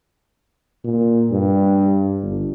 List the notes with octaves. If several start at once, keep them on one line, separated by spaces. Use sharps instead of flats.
A#2
G2
G1